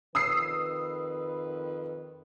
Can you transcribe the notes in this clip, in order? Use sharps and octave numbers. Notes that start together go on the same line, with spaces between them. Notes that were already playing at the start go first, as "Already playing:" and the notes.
F2 D#3 B4 D#6 E6 C7